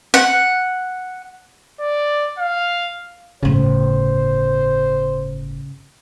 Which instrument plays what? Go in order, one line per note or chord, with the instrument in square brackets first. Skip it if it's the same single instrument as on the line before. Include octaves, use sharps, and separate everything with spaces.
[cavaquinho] F#5
[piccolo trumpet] D5
F5
[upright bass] G1 A2 [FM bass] C#3 [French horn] C5